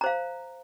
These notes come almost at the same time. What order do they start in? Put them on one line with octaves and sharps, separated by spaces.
A#5 C5 F5